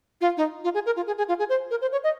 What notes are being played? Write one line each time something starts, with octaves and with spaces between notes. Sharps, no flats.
F4
D#4
F4
G#4
A#4
F4
G#4
G#4
F4
G#4
C5
A#4
C5
C#5
D#5